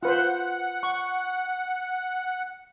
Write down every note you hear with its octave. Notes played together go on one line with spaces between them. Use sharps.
F4 B4 C5 F#5
C#6